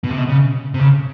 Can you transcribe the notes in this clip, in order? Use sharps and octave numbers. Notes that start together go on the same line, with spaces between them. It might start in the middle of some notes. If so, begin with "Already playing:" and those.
B2
C3
B2
C#3
C3
C#3